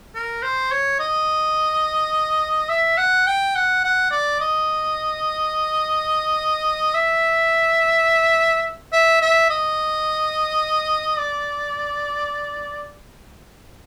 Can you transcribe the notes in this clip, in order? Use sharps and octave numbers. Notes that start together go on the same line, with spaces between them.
A#4
C5
C#5
D#5
E5
F#5
G5
F#5
F#5
D5
D#5
E5
E5
E5
D#5
D5